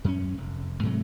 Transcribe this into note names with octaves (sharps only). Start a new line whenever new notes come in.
F#2 C#4
F1
G#2 C3 F#3 A3